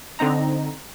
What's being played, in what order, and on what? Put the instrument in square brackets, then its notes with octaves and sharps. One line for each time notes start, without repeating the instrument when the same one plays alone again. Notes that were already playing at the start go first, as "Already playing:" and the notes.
[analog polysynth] D3 C4 D#4 A#5